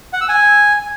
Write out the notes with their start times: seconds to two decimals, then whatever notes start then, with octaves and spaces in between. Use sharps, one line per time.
0.13 F#5
0.21 E6
0.29 G#5